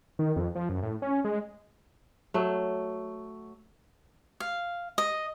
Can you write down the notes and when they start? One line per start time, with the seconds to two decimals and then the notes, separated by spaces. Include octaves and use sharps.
0.19 D#3
0.36 F2
0.55 F3
0.69 F#2
0.83 A2
1.02 C#4
1.25 G#3
2.34 F#3 A3
4.40 F5
4.98 D#5